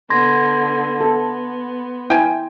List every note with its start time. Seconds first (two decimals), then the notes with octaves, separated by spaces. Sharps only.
0.10 D3 B3 C6 G#6 A#6
1.01 B3 A4
2.10 E4 G5 G#5